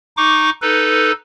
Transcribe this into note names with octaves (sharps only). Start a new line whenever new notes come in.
D#4 C#6 D6
D#4 A4 B4